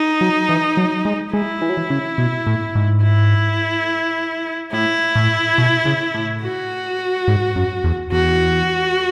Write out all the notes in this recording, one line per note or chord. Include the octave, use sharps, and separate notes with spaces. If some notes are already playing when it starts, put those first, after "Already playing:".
Already playing: D#4
F#3
E3
F#3
G#3
G#3 E4
E3
F#3
E3
C#3
B2
A2
G#2
E4
A2 E4
A2
B2
C#3
A2
F#4
G#2
F#2
E2
E2 F#4